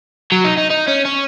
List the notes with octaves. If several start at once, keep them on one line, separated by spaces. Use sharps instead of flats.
F#3
D#4
D#4
D#4
C#4
C#4